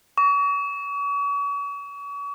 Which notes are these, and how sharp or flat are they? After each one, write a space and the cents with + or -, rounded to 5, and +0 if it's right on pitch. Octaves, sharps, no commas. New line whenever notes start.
C#6 +40